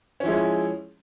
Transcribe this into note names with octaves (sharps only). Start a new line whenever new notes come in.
F3 G#3 C#4 E4